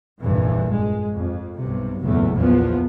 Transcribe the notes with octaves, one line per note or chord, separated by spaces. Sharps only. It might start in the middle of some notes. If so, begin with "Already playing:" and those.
F1 A#1 G2 E3
G#3
F2
B1 G2 C3
F#1 B1 E2 A2 A3
A#1 E2 F3 B3